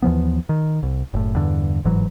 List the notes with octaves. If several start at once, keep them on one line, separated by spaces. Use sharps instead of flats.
D#2 E3 F3 B3
D#3
C2
F#1 A2
E2 G2 D3
G1 G#2 E3 F#3